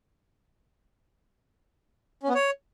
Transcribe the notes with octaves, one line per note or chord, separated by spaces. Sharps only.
C#4
B3
C#5